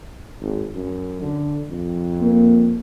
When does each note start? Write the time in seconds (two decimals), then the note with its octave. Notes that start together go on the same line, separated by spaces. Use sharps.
0.40 G#1
0.75 F#2
1.21 D3
1.69 F2
2.22 A#3